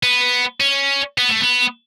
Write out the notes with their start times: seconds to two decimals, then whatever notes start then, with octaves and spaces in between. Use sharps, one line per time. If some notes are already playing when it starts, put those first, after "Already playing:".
0.03 B3
0.60 C#4
1.18 B3
1.29 A3
1.40 B3